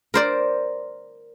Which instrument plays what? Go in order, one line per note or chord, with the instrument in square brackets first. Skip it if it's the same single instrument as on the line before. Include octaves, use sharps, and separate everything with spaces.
[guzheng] A#4 C5 D5